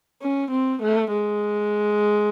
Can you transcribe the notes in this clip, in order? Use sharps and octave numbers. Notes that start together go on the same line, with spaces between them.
C#4
C4
A3
G#3